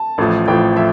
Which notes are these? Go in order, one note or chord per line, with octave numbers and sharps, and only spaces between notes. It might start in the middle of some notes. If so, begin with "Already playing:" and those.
Already playing: A5
A1 A2 F3
A1 A2 F3 G5
F3 E5